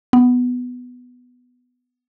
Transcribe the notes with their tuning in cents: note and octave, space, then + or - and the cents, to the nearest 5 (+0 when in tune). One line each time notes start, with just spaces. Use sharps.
B3 +5